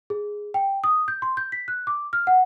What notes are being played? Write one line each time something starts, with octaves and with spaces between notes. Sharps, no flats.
G#4
G5
D#6
G6
C6
G6
B6
F#6
D6
F6
F#5